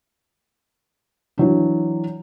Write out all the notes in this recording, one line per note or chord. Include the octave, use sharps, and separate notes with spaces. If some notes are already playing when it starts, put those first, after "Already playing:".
E3 F#3 D4